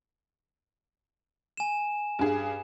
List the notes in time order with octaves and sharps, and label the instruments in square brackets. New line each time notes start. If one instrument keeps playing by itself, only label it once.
[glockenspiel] G#5 E7
[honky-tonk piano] G2 G#4